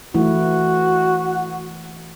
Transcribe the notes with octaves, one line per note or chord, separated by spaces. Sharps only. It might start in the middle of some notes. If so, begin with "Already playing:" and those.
E3 A3 E4 F#4